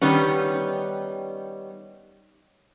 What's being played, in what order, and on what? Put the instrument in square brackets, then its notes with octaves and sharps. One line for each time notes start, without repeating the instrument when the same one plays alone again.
[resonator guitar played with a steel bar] D#3 G3 B3 C#4